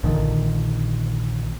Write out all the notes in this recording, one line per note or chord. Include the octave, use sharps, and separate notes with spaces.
A#1 A#2 D3 D#3